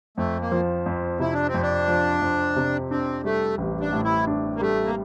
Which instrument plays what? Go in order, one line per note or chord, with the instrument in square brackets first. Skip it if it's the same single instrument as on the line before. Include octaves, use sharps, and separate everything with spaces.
[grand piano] F2 [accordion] A3
[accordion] A#3
[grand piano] F3
F2
[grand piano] C3 [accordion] E4
[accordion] D4
C4
[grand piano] F2
[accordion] D4
[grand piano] F3
F2
C3
[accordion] C4 [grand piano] D4
[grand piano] G3 [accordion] A3
[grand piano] A1
[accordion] D4
[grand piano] A2
[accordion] E4
[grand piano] D4
[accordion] A#3
[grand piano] G3 [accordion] A3
[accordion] A#3